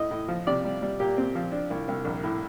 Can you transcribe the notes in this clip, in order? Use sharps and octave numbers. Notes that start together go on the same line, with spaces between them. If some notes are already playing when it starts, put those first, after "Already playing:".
Already playing: A2 D#5
A2
F3
C3 D5
G3
G3
A#2 G4
C4
F3
D4
C2
C2
A#1
A2